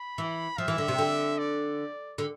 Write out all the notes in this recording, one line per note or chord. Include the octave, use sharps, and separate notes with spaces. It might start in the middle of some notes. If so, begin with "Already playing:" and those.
Already playing: B5
E3
F3 E5
E3
D3
C3
D3
D5
D3